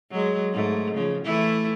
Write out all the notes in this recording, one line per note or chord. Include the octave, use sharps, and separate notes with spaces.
F#3 G#3
G#2 A3
C#3 F3
E3 A3 E4